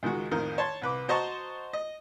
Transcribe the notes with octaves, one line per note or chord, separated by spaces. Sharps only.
C#2 D#3 G#3 F#4
A1 F2 D#3 A#4
C#5 A5 C6
C2 B4 D6
F#4 C5 D#5 A5 A#5 C#6
D#5